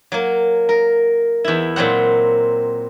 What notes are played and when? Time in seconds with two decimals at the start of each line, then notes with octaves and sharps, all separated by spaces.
0.12 F#3 A#3
0.69 A#4
1.44 E2 E4
1.76 A#2 F#3 C4 F#5